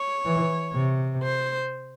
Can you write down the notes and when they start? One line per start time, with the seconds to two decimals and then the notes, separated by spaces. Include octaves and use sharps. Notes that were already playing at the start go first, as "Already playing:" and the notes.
Already playing: C#5
0.26 E3
0.74 C3
1.23 C5